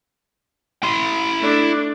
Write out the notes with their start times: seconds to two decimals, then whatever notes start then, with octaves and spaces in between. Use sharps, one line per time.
0.84 E4 C6
1.39 A3 D4